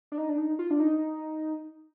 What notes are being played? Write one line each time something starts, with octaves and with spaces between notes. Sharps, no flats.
D4
D#4
D4
D#4
F4
D4
D#4